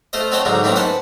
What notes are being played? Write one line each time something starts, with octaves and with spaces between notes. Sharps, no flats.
A3 F4 C5 D#5
C4 F#4 C#5 D#5 G5 A5
G#2 D3 F#3 D#4
A2 D#3 E3 A#3 C4 C#4
B4 C5 F#5 G5 A5